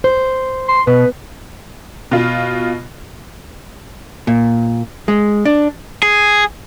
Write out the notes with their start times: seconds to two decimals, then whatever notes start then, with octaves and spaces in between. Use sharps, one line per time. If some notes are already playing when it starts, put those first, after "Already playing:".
0.04 C5
0.69 C6
0.87 B2 B4
2.11 B2 F4
4.27 A#2
5.08 G#3
5.45 D4
6.03 G#4